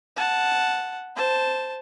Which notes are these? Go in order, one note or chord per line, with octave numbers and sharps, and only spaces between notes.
F#5 A5
C5 A5